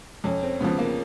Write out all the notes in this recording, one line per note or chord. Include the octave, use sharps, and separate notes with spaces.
F2 C#4
C4
C#3 F3 B3
A#3